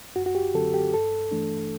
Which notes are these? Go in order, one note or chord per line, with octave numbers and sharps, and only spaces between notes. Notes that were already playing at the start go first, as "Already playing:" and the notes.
F#2 F#4
F#4
G4
D3 F#3 C4 A4
G4
G2 A4
E3 A3 D4